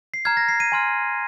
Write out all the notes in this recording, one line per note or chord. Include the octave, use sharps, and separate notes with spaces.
C7
A#5 F6 G#6
A#6
C7
D#7
G#5 C6 F6